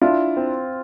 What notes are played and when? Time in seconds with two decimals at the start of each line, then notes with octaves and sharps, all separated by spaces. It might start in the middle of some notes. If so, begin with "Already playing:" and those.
0.01 D4 E4 F4
0.37 C4